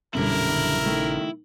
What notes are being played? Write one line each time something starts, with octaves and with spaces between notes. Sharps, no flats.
A#1 F#2 B2 D3 G3 C#4 E4 A#4
A#1 C#3
D#3 A3